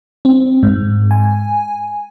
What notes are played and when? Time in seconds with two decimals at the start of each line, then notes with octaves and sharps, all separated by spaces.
0.25 C4
0.63 G#2
1.11 G#5